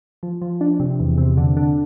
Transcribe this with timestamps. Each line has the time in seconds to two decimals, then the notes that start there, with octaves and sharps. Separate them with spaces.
0.23 F3
0.42 F3
0.61 D4
0.80 C3
1.00 E2
1.18 C3
1.37 D3
1.57 D3